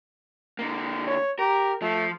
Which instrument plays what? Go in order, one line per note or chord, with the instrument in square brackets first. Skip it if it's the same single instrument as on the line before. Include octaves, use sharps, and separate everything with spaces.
[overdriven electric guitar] D3 A#3
[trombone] C#5
[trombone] G4 [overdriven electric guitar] A#4
[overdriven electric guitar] F3 [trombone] A3